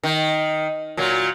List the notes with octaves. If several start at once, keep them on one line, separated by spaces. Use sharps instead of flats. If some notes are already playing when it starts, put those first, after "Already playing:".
D#3
A#2 F#3